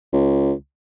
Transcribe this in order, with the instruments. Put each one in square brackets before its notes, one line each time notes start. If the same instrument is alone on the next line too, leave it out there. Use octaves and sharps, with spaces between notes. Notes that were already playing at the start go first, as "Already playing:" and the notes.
[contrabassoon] C#2